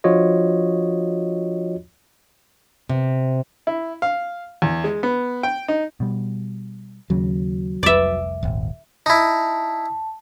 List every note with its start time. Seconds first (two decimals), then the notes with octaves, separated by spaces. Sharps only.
0.04 F3 D4 F4 F#4 C#5 D#5
2.89 C3
3.67 E4
4.02 F5
4.62 E2
4.84 G#3
5.03 B3
5.43 G5
5.68 D#4
6.00 B2 G3
7.10 D#2 C#3 F#3
7.83 F1 C2 D5 E5
8.43 D#1 G#1
9.06 D#4 E4 A5